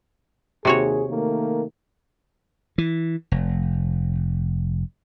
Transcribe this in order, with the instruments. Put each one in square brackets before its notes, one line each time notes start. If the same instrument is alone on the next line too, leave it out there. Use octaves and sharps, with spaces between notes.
[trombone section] D#2 G#4 [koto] C3 F#4 C#5
[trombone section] D#3 A3 A#3
[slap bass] E3
F1